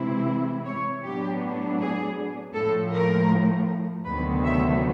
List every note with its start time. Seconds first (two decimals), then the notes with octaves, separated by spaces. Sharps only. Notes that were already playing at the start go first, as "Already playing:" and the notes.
Already playing: C3 E3 G#3 C4 E4
0.65 C#5
1.03 A2 F#3 B3 D4 G4
1.79 G#4
2.53 A2 F3 A3 A4
2.92 A#4
4.05 D2 C3 D#3 F#3 B3 B4
4.44 E5